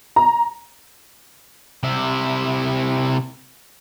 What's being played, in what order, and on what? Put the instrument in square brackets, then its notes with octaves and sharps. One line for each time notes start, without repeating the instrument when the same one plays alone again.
[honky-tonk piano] A#5
[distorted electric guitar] C3 E4